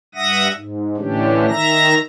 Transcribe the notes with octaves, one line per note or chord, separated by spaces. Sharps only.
G2 E5 F#5 D#6 A#6
G#2
A2 D3 E3 C#4 D4 G4
D#3 E5 A#5 A#6